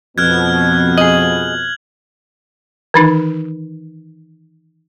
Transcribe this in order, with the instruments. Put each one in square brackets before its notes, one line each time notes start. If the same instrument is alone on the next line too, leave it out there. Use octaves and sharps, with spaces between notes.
[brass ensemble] F2 B2 [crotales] F6 F#6 G#6
[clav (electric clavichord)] G#4 D#5 [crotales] F#7
[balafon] D#3 E3 D#4